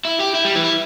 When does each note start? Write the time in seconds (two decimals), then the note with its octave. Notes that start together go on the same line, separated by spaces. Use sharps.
0.05 E4
0.20 G4
0.35 E4
0.45 G3
0.55 E3
0.64 E4